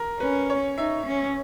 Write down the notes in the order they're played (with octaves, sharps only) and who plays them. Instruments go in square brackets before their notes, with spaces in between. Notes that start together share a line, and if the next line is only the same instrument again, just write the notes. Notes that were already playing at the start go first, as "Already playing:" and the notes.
Already playing: [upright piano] A#4
[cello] C#4 [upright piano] B4
[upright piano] C#5
[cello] D#4 [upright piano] E5
[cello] C#4